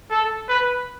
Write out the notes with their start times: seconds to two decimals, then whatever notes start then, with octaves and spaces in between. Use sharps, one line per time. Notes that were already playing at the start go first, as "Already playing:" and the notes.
0.11 A4
0.49 B4